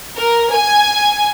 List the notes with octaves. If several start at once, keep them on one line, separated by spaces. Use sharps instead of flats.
A#4
G#5